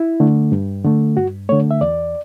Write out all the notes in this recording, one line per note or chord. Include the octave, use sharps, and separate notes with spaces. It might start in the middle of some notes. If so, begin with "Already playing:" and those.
Already playing: E4
D3 A3
G2
D3 A3
G2 F#4
D3 A3 C#5
E5
E2 D5